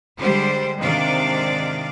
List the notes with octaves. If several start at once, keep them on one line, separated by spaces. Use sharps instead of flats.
D3 G3 G#3 G4 C5
G#2 C3 D#3 D4 D5 F5